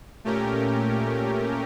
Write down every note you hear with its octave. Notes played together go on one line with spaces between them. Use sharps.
A#2 A3 C#4 G4 A#4